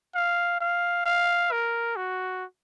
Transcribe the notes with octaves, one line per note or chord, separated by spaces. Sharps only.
F5
F5
F5
A#4
F#4